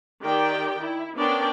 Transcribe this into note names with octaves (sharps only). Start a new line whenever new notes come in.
D#3 G4 D5 G5
E4
B3 C#4 D4 A#4 D5 G5